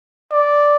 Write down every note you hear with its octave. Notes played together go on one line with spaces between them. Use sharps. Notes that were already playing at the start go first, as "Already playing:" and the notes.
D5